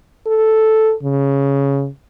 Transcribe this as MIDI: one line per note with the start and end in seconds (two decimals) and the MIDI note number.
0.27 0.94 69
1.03 1.89 49